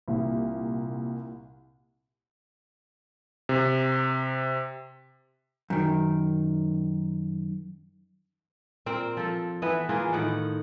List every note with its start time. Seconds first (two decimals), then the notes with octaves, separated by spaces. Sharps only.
0.08 C2 A#2
3.49 C3
5.70 F#2 D#3
8.86 A#2 C4 A#4
9.17 F3 A4
9.62 E3 B3 B4 E5
9.89 E3 A#3 F4 G#4
10.13 A2 D#3 D#5 F#5